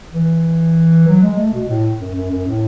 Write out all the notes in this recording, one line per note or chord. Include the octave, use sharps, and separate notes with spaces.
E3
F#3
G#3
A3
B2
A2
F#2
F#2
F#2
A2